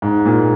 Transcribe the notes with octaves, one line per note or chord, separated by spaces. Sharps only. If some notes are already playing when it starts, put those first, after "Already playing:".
G#2
A#2